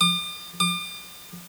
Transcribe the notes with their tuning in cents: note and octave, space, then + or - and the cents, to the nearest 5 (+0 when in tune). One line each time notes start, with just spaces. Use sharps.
D6 +45
D6 +40